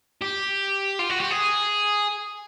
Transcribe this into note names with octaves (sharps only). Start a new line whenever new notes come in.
G4
F4
F#4
G4
G#4